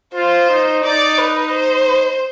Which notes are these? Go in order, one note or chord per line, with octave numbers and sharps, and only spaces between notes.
F4 C5
D#4
D#4 D5
B4
C5